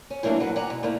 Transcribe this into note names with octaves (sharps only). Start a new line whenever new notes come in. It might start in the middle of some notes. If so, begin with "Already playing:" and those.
C#4
E3 F#3 A3 A#3 D4
F#3 B4 F#5
D#2 D5 F#5 G#5 A#5
B2
A3 A#3 E4